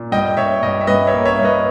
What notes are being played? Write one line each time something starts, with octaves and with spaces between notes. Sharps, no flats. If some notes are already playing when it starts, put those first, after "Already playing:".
Already playing: A#2
G2 D#5 G5
G2 C#5 E5
G2 D#5 G5
E5
G2 B4 D#5
C#5 E5
A#3
C#5 E5
G2
B4 D#5